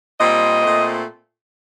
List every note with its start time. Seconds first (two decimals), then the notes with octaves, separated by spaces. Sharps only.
0.20 A#2 G3 C4 D#5
0.62 A#2 A3 C4